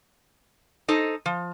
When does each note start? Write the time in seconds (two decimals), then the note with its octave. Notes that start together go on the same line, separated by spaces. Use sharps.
0.88 D#4 A4 C5 D#5
1.26 F3